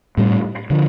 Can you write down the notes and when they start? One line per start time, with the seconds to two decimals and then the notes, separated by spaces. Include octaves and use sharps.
0.17 A2 G3 C4
0.70 D3 F3